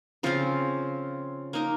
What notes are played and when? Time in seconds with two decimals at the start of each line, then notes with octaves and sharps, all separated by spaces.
0.23 C#3 F3 C4 F4
1.53 A#3 D#4 A#4